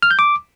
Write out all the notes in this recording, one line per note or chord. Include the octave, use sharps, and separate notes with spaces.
F6
G6
D6